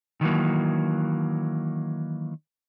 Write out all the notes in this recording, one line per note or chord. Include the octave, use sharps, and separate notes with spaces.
D#3 E3 F#3 A#3